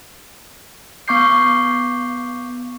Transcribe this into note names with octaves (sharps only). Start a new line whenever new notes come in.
B3 F5 C#6 D6 G6 C7